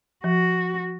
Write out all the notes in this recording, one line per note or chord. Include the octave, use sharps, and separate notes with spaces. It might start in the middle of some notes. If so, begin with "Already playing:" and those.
F3 F#4